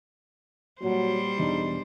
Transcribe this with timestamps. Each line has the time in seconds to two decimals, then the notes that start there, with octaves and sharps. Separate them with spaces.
0.82 A#2 F#3 G3 C5
1.38 E1 E2 D4 D#4